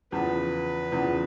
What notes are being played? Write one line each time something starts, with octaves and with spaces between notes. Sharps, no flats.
E2 C#3 F3 B4
E2 C#3 F3